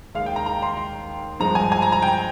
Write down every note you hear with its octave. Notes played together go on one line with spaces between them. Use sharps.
D#2 D#3 G#3 F5
G5
A#5
A#5
C6
C6
G2 F3 G#3 A#5
G#5
G#5
A#5
A#5
G5